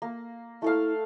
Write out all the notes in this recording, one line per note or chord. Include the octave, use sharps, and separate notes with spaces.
A#3
A3 E4 A4 F5